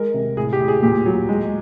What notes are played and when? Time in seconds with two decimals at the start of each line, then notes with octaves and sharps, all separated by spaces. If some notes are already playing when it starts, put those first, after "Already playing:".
Already playing: G#3 A#4
0.14 C3
0.37 A2 G#4
0.53 G4
0.60 A2
0.68 G#4
0.82 A#2 G4
1.06 F#3
1.29 G#3